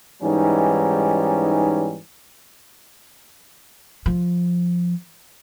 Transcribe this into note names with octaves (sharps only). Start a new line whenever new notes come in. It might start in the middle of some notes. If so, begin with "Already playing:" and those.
G#2 E3 G3 C#4 D#4
F3